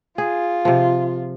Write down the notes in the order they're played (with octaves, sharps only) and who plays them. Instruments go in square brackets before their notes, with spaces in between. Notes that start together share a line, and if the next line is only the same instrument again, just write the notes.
[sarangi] F4 [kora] G#4
[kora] C3 F3